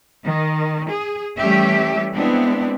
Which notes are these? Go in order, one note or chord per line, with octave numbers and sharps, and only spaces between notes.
D#3
G#4
E3 G3 A3 C#4 G4 E5
G#3 B3 C4 D4 E4